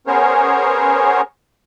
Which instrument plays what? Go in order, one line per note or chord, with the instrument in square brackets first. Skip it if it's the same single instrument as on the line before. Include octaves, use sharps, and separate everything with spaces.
[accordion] B3 C#4 G#4 A#4 C5 C#5